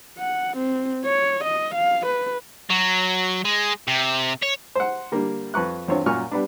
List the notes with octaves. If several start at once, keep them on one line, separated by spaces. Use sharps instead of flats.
F#5
C4
C#5
D#5
F5
B4
F#3
G#3
C3
C#5
C5 F#5
D3 G3 A#3
F2 B4 C#6 F#6
E2 G2 C4 F4 C#5
F#2 A#2 G#5 C#6 F6
G3 B3 D4